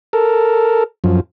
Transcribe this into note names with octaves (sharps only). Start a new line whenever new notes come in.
A4 A#4
F#2 F3